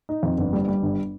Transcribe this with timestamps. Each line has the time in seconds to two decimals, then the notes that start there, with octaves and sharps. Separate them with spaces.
0.09 D#4
0.23 F2
0.38 G1
0.53 G3
0.68 G3
0.83 G1